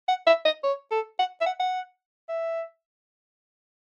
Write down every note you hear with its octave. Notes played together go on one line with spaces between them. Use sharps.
F#5
E5
D#5
C#5
A4
F#5
E5
F#5
F#5
E5